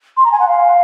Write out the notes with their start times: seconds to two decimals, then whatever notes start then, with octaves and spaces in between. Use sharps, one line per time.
0.17 C6
0.24 A#5
0.31 G#5
0.39 F#5
0.47 F5